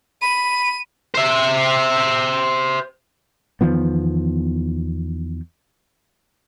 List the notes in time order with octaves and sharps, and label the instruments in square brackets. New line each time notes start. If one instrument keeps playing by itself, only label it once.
[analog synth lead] B5 [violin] D#7
[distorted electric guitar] C5 E5
[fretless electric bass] E2 D#3 F3 B3